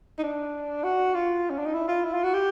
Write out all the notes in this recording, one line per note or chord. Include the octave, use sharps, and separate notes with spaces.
D#4
D4
F#4
F4
C#4
D4
D#4
E4
F4
E4
F4
F#4
G4